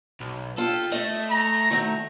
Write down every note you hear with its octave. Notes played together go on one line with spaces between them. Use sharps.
B1
F4 G4 A4
A3 D#5
A#5
D#3 F#3 A3